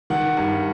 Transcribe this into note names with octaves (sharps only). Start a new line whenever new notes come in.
D#3 F#5
G2